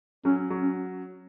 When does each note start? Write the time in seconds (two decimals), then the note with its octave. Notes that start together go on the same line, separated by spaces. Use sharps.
0.25 F#3 C#4
0.50 F#3
0.62 C#4